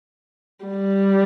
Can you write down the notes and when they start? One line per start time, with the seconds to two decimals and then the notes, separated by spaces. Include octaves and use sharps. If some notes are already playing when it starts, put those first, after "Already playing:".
0.65 G3